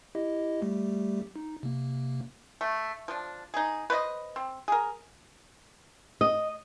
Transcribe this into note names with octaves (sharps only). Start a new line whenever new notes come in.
E4 G4 D#5
G3 A3 G4
D#4
C3 A#3
A3
F3 D4
D#4 G#4
B4 C5 D5 D#5
C4
G#4 A#4
D#5